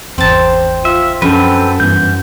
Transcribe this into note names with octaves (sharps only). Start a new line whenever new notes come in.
G#1 E2 C4 C5 A5
F4 E5
F#2 F3 C4 D4 A4 B4
G2 E3 B3 G6